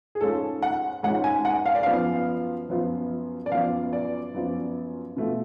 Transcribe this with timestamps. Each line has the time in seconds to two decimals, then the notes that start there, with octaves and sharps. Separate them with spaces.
0.15 G#4
0.21 G#2 G#3 C#4 F4 A4
0.63 F#5
1.03 G#2 G#3 C#4 F4 F#5
1.24 G#5
1.45 F#5
1.66 F5
1.75 D5
1.83 F#2 F3 B3 F4 F5
2.69 F#2 F3 B3 F4
3.46 D5
3.51 F#2 F3 B3 F4 F5
3.93 D5
4.34 F#2 F3 B3 F4
5.17 B2 A3 F4